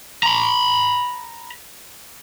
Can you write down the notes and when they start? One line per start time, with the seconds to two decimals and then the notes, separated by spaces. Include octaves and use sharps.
0.23 A#5 B5